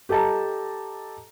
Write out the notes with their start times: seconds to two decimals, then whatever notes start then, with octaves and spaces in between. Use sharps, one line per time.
0.09 G4 A4 D#5 A5 A#5